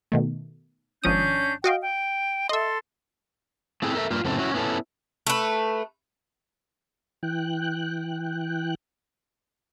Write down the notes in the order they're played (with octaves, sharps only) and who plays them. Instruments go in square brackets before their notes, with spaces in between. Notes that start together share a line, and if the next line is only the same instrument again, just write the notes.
[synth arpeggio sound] B2 D#3 A3
[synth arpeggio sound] G#1 F3 D#6 [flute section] C#4 D4 G6
[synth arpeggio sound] F#4 D#5 F5 [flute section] G5
[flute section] G5
[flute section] A4 C6 [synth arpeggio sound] D#5 E5
[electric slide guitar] A3 C4 E4 G#4
A4 A#4 D#5 E5
G2 A#3 F4
F#2 A2 C#3 C4 A4
C#4 E4 F#4
B3 C#4 E4 G4 A4
[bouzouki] A3 B4
[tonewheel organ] E3 G5 F#6